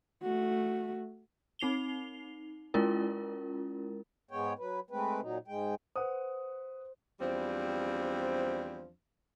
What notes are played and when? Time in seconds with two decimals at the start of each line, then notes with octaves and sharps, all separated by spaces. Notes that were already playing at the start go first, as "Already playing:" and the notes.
0.23 A3 F#4
1.59 C4 D#4 C7 F7 G7
2.74 G#3 C#4 E4 F4 A#4
4.31 G#2 G#3 B3 C#5 G5
4.59 F#3 B4
4.91 G#3 A3 C4 B4
5.21 A#2 F#3 D#4
5.48 G#2 G#3 G5
5.96 B4 C5 F#5 D#6
7.20 E2 F3 G3 C4 D4